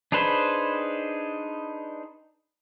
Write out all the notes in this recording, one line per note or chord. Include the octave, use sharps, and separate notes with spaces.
D4 D#4 G#4 B4 C5